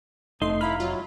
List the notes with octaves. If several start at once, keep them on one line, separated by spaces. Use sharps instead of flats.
F1 F2 A3 D#4 C6
E4 F5 A#5 B5 F6
F#3 F4